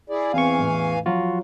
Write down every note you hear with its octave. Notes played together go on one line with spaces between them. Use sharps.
E4 G#4 D5
E2 E3 C4 F5 G#5 C#6
A1
F3 F#3 F4 F#4